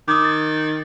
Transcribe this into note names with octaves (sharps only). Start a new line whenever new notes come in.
D#3 D6 D#6
A6